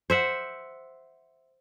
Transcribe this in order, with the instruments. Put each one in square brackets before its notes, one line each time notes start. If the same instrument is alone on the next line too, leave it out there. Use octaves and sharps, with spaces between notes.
[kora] C5 E5 F#5